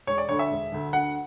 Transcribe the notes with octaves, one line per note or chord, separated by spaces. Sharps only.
E1 C#5
D5
D2 D3 C#5
E5
E1
D2 D3
D2 F#5